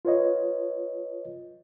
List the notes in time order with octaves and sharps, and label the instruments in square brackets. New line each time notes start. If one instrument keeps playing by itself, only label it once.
[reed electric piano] F4 B4 C#5 D#5